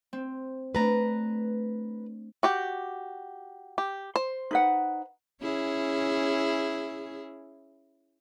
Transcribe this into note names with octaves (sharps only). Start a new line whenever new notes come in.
C4
A3 D4 B4 A#5
F#4 G4 G5
G4
C5
D#4 B4 F#5
C#4 E4 G#4